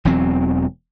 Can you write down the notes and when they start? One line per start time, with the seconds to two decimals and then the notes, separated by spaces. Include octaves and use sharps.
0.05 E1 E2 F#3 C4